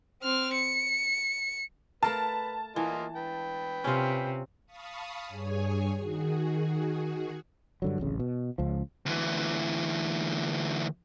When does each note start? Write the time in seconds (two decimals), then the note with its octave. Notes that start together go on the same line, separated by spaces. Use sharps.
0.22 C4 F6
0.54 C#7
2.03 A3 A#4 B4 F5 A5
2.76 E3 A#3 F4 D#5
3.16 B4 G5
3.84 C3 C#4 F4
4.66 F5 A5 B5 C#6 D#6
5.24 G2 G#4 C#5 G#5
5.97 D#3 F#4 G#4
7.82 G2 D3 F#3
7.99 D1 A1 C#3
8.19 B2
8.58 C#2 F3
9.06 D2 E3